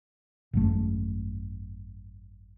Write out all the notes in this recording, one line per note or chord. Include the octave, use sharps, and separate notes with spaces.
G#1 F#2 A3